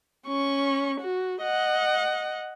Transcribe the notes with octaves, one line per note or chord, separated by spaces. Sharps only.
C#4 C#6
F#4
D#5 F#5